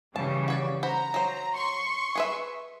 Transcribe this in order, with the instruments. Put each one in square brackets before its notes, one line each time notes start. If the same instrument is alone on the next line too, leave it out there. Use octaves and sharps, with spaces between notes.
[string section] C#3 E3 G3 [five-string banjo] A5
[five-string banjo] F#4 C#5 D5
[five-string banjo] C5 F#5 B5 [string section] A#5
[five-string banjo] F#3 C5
[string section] C6 C#6
[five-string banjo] G#4 B4 E5